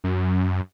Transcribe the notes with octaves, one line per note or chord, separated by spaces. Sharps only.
F#2